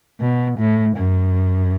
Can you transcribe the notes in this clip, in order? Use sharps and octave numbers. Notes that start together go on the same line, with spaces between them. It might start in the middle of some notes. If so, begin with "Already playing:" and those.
B2
A2
F#2